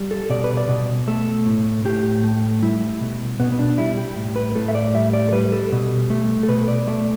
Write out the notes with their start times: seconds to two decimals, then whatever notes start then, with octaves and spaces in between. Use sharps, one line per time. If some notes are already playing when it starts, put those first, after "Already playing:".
Already playing: G3
0.11 A4
0.30 B2 D5
0.44 B4
0.57 D5
0.69 B2
1.07 A3 A4
1.46 A2
1.85 A2 G4
2.24 A3
2.62 G3 E4
3.01 B2
3.40 B2 B3
3.52 B3
3.59 D4
3.78 G3 E4
3.97 G4
4.16 A2
4.36 B4
4.55 A2 A4
4.68 E5
4.75 D5
4.94 G3 E5
5.13 D5
5.29 A4
5.32 G3 B4
5.52 A4
5.72 B2
6.10 A3
6.43 A4
6.48 B2 B4
6.68 D5
6.87 A3 D5